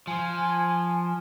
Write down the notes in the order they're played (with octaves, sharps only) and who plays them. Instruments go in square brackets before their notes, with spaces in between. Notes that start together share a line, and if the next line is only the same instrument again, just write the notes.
[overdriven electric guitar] F3 [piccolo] G#5